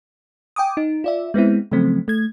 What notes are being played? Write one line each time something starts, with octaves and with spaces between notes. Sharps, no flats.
G5 G#5 D6 D#6
D#4
F4 D5 E5
G#3 B3 C4 E4
C#3 F3 F#3 A3 C4
A3 G#6